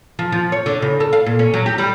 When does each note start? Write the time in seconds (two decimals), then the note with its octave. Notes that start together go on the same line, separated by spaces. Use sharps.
0.19 F3
0.32 F3
0.52 C#5
0.66 D3
0.82 C#3
1.00 A4
1.13 F5
1.26 A#2
1.39 C#4
1.54 F#3
1.66 G4
1.78 G3